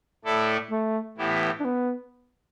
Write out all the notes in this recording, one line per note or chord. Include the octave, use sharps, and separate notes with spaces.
A2 A3 E4 A4 D5
A3
A2 E3 B3 E4 G4
D4
B3